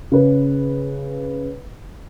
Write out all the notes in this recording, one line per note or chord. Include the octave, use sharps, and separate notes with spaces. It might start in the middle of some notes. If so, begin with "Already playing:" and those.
C#3 B4